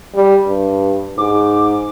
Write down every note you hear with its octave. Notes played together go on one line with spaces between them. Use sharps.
G3
G2
G#2 D6